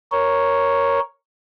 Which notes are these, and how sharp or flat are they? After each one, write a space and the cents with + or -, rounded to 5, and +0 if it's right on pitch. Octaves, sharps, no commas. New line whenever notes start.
A#4 +5 C#5 +0